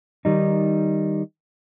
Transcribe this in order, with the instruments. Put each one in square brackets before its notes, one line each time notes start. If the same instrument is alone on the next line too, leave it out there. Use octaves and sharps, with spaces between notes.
[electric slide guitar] D#3 G3 D#4